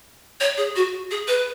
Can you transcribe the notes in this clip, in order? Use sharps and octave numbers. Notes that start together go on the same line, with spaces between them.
C#5
G#4
F#4
G#4
B4